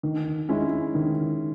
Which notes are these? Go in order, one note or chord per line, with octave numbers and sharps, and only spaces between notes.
D#3
G#3 C#4 E4
D#3